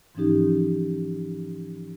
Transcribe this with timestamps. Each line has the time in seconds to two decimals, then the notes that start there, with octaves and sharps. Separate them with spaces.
0.15 G#2 E3 F3 C#4 D#4 G4